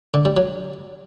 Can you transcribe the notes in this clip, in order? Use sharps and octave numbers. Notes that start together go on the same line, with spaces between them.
D3
G3
F#3